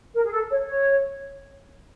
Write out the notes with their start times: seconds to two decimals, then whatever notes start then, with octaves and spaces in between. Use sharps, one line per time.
0.14 A#4
0.24 G#4
0.31 A4
0.48 C#5
0.65 C#5